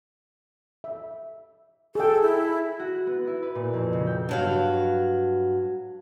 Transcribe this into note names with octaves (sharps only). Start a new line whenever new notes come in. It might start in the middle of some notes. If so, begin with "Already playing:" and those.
E5
G#4 A4 G5
E4
F#4
F#6
B3
E4
B4
A#2
F2
C#3
G5
G2 F#3 F5